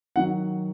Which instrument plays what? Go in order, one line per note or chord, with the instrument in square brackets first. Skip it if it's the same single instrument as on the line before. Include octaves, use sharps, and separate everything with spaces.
[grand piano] D#3 F#3 F#5